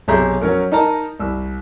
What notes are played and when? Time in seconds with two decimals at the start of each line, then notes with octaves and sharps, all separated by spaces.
0.08 B1 C3 G#4 E5 A#5 G6
0.42 F#3 C#4 A#4
0.72 D#4 A#4 D#5 A5 A#5
1.19 C2 E6